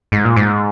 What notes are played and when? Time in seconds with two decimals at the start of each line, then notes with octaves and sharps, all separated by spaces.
0.12 G#2
0.25 A#2
0.36 G#2